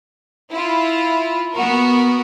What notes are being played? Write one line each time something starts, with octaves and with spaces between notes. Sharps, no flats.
E4 F4
B3 F#4 A#4